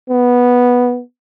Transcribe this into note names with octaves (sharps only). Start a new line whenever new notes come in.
B3